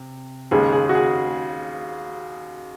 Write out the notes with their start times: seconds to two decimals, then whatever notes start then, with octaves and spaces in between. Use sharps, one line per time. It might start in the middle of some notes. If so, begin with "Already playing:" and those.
Already playing: C3
0.51 D#2 C#3 G#3 G#4
0.72 G#4
0.89 F#4
0.95 G#4